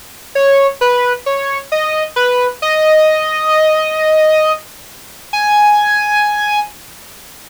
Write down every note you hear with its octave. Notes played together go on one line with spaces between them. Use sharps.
C#5
B4
C#5
D#5
B4
D#5
G#5